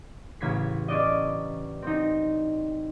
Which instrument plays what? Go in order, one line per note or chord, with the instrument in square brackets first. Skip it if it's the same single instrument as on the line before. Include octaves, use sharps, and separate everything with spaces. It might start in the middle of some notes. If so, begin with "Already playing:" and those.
[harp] A1 C#3 G#6 B6 C7
C#4 D4 D5 D#5
C4 D#4